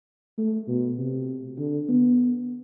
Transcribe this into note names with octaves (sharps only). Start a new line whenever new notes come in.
A3
B2
C3
D3
B3